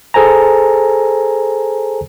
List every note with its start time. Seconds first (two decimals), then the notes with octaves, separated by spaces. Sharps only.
0.14 G#4 A4 C5 G#5 A#5